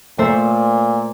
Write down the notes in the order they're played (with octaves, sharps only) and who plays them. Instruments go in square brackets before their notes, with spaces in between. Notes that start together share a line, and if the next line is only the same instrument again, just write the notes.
[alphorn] A#2 [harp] A3 C5 E5